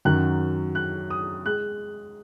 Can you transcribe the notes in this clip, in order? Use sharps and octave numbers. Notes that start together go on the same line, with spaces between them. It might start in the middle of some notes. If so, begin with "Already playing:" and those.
F#2 D#3 F#3 F#6
F#6
D#6
G#3 F#6